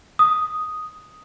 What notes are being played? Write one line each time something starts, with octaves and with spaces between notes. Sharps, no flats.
D#6